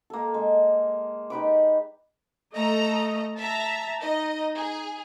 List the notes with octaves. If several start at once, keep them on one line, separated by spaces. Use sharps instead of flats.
A#3 A4
G#3
D#4 G4 B4 D6
A3 A4 D#5 A#5
E5 A5 A#5
D#4 D#5
G#4